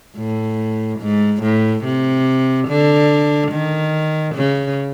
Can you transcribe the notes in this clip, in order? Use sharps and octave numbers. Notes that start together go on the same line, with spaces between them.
A2
G#2
A2
C3
D3
D#3
C#3